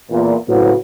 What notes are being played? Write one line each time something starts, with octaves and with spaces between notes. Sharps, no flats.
E2 A#2
A2 C#3 F#3 C4 F#4 B4